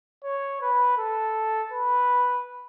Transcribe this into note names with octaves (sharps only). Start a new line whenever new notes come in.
C#5
B4
A4
B4